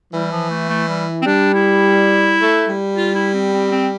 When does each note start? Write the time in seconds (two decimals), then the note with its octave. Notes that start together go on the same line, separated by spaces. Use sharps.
0.13 E3 G3
0.32 F3
0.50 A3
0.69 A3
0.89 G3
1.22 C4
1.26 G3 D4
1.54 E4
2.40 A3
2.68 G3
2.96 F4
3.15 E4
3.34 C4
3.53 C4
3.71 C4